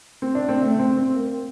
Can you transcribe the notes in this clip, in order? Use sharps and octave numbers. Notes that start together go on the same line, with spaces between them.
C4
D4
C4
A3
C4
C4
A#3